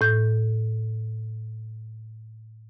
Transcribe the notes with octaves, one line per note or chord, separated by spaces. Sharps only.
A2 G6